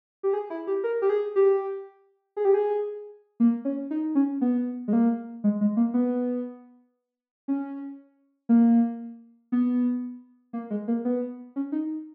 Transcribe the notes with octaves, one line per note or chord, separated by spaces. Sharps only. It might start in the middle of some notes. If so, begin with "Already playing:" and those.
G4
G#4
E4
G4
A#4
G4
G#4
G4
G#4
G4
G#4
A#3
C#4
D#4
C#4
B3
G#3
A#3
G#3
G#3
A#3
B3
C#4
A#3
B3
A#3
G#3
A#3
B3
C#4
D#4